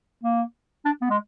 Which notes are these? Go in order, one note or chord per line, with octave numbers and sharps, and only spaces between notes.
A#3
D4
B3
G#3